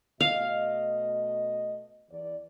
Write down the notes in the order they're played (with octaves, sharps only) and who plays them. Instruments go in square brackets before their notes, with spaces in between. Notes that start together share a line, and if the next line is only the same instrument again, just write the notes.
[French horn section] B2 A3 D#5 [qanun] F5
[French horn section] E2 D5